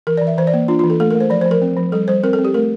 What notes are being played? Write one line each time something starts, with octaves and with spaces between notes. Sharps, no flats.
E3 A#4
D5
E3
E5
E3 C5
D5
A#3
D4 F4
F4
E3
A4
A3 A4
A#4
A3
C5
F3 D5
C5
F3
A#4
C4
F3
G3 A4
G3 C5
C4 A#4
A4
C4
G4
A3 A#4